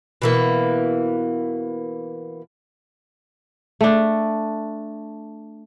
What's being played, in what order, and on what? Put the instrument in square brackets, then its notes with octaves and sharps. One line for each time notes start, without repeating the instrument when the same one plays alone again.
[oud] B2 E3 A#3
[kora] A3 D4